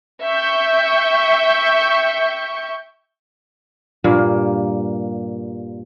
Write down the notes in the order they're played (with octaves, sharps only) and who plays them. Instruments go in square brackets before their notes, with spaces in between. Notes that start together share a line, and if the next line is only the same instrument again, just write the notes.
[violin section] E5 G5 C#6 G6
[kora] G2 A#2 A#3